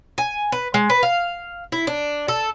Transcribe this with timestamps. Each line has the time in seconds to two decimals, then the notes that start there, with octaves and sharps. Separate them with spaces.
0.18 G#5
0.52 B4
0.74 G#3
0.90 B4
1.03 F5
1.72 E4
1.87 D4
2.28 A4